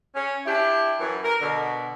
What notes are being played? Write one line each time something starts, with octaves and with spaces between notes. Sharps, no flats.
C#4
D4 E4 G4
F#2 E3
A#4
B2 D3